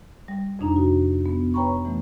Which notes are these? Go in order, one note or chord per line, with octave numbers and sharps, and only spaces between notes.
G3
F2 C3 D4 D#4 A#5
F#4
B3
B4 C#5 G5 A#5 B5 C#6
E3 A3